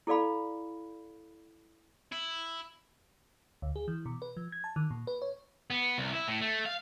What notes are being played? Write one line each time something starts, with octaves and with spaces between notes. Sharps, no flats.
E4 A4 D5 F5 B5
E4
D2
G#4
E3
B2
B4
F3
G#6
A5
D#3
A#2
B4
C#5
B3
C2
E4
A2
A3
F5